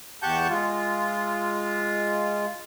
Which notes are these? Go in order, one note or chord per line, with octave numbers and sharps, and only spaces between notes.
E2 G4 F#5 A5 C#6 G6
G#3 F4